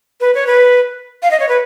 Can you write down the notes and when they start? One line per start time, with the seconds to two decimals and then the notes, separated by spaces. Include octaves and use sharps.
0.21 B4
0.35 C#5
0.47 B4
1.23 F5
1.31 D#5
1.40 C#5
1.49 B4